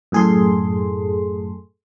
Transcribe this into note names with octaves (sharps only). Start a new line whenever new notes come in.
F#2 A2 G#4 A4 C6